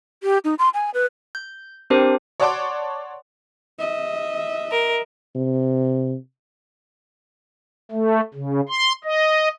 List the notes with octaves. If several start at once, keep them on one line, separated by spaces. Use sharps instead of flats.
G4
D#4
C6
G#5
B4
G6
C4 D4 G4 A#4 C5
C#5 D5 F#5 A5 C6 D6
D#5 E5
A#4
C3
A3
C#3
C6
D#5